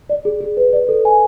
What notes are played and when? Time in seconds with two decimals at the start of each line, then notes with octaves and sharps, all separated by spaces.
0.10 D5
0.25 G#4
0.41 G#4
0.57 B4
0.73 D5
0.89 A4
1.05 G#5